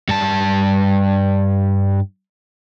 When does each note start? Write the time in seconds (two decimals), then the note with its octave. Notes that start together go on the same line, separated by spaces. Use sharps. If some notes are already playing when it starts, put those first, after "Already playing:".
0.09 G2 A5